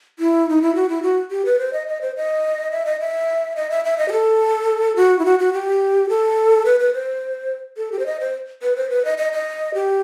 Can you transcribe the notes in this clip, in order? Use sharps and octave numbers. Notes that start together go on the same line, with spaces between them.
E4
D#4
E4
F#4
E4
F#4
G4
B4
C5
D#5
D#5
C5
D#5
E5
D#5
E5
D#5
E5
E5
D#5
G4
A4
F#4
E4
F#4
F#4
G4
A4
B4
B4
C5
A4
G4
C5
D#5
C5
B4
C5
B4
D#5
D#5
D#5
G4